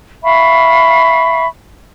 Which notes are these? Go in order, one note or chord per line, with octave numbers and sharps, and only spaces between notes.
E5 F5 B5 C#6